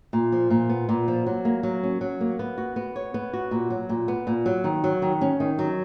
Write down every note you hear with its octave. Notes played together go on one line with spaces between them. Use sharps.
A#2
F3
A#2
B3
A#2
F3
F#3
A#3
F#3
C#4
F#3
A#3
B3
F#4
B3
C#5
B3
F#4
A#2
F#3
A#2
B3
A#2
F#3
D#3
F#3
D#3
C#4
D#3
F#3